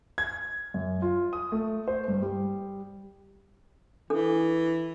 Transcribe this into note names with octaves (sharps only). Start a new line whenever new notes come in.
G#6
F#2
F4
D#6
A3
C5
G2
G3
E3 D4 A4 D6